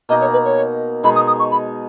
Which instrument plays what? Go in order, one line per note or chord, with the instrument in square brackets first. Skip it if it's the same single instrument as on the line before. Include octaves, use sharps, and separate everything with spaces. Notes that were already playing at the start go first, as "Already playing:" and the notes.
[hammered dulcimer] B2 A#3 D#4 [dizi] D#5
[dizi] C#5
B4
C#5
[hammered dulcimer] B2 G#3 D#4 G#4 [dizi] B5
[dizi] D#6
D#6
C#6
B5